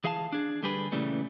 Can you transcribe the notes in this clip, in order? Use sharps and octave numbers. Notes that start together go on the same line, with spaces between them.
E3 G#4 F5 F#5 A5
D4 G#4
D3 G3 G4 G#4 B4
A#2 C#3 E3 G3 A3